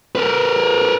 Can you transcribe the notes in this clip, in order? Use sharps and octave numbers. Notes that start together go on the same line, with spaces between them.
A#4 B4